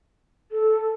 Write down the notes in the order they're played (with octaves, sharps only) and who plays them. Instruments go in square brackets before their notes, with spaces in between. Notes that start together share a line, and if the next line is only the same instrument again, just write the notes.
[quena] A4